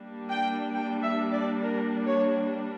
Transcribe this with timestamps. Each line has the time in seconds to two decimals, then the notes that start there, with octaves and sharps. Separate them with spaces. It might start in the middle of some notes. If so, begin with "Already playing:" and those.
Already playing: G3 A#3 D4
0.29 G5
0.74 G5
1.02 E5
1.32 D5
1.62 A#4
2.05 C#5